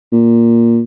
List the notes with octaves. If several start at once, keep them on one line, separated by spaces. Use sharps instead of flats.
A#2